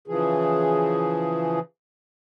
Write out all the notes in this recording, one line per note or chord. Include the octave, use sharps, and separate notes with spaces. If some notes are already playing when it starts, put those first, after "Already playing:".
C#3 E3 F3 G#4